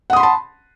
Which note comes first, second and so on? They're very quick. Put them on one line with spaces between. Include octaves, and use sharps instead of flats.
F#5 D#6 C6 B5 A5